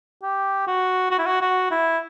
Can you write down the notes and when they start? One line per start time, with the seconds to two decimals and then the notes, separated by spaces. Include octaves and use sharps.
0.23 G4
0.67 F#4
1.11 F#4
1.19 E4
1.26 F#4
1.41 F#4
1.71 E4